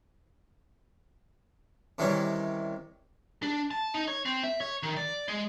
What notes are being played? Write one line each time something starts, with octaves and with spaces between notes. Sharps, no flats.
C3 D#3 E3 G3 C#4
D4
A5
D#4
C#5
C4
E5
C#5
D#3
D5
G#3